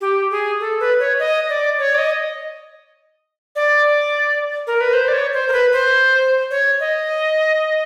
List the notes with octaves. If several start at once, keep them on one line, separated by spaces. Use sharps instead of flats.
G4
G#4
A4
B4
C#5
D#5
D5
C#5
D5
D#5
D5
A#4
B4
C5
D5
C#5
C5
A#4
B4
C5
C#5
D#5